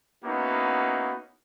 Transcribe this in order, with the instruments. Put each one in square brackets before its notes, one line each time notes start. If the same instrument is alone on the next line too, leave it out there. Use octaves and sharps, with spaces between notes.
[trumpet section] A#3 B3 C#4 D#4 E4 F#4